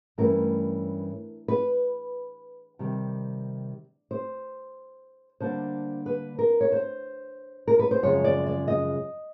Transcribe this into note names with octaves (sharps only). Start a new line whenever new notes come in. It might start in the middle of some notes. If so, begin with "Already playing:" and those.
G2 E3 A3 C#4 A#4
B4
C3 D#3 G3
C5
D3 G3 A#3 D4 C5
B4
A#4
C#5
C5
A#4
B4
C5
F#2 C#3 F3 G#3 C#5
D5
D5
D#5